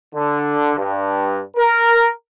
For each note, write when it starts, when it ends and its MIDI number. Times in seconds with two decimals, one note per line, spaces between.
0.14 0.77 50
0.77 1.40 43
1.57 2.07 70